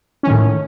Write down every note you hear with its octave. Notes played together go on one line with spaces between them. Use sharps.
A2 D#3 C#4